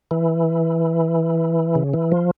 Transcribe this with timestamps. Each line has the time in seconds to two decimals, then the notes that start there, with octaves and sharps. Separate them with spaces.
0.11 E3
1.75 C#3
1.94 E3
2.12 F3